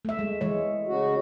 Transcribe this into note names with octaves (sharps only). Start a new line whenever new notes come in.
A3 E5
G#3
E3 G#3 C#5
C#3 F#4